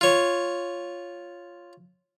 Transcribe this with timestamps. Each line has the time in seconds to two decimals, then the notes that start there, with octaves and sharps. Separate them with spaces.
0.01 F4 C#5